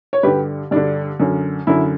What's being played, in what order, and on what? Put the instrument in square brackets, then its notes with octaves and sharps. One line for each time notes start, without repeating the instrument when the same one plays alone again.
[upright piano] C#5
G2 D3 G4 B4
G2 D3 D4
F#2 D3
F#2 D3 E4